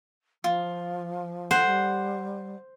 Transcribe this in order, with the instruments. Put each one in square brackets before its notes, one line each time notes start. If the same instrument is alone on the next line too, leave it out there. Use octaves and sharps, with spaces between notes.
[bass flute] F3 [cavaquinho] F4
[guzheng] C5 [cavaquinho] F#5
[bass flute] G3